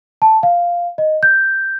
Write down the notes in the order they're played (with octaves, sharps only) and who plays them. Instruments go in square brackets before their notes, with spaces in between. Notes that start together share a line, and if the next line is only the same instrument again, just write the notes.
[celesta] A5
F5
D#5
G6